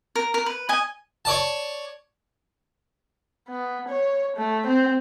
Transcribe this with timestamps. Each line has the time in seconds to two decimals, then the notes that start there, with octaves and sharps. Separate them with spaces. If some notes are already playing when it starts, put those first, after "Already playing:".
0.16 A#4
0.34 A#4
0.46 B4
0.69 D#5 G#5
1.25 C#5 D5 A5
3.48 B3
3.88 C#5
4.37 A3
4.67 C4